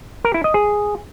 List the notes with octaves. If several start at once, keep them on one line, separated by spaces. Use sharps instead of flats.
A#4
E4
D#5
G#4